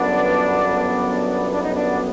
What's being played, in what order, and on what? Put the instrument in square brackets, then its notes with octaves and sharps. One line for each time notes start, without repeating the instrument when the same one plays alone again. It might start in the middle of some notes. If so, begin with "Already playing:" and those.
Already playing: [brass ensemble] G1 F#2 D3 F#3 B3 [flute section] D4
[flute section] D4
D#4
D4